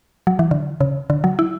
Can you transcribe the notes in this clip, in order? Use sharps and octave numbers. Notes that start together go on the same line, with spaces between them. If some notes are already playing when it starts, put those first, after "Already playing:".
F#3
E3
D3
C#3
D3
F#3
E4